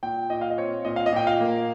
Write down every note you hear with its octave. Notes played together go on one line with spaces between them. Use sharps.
A#2 G5
A#2 D#5
F5
D#5
C4 C#5
A#2 D#5
F5
D#5
A#2 G5
F5
A#3